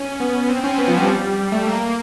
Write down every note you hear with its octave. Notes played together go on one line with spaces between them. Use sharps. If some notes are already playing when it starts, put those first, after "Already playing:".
Already playing: C#4
B3
B3
C4
C#4
B3
F3
G3
A3
A#3